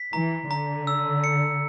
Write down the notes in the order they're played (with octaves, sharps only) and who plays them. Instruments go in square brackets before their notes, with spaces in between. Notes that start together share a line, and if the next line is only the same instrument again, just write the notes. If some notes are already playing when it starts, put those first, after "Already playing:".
Already playing: [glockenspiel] B6
[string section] E3 [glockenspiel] A#5
[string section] D3 [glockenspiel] A#5
[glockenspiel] E6
C#7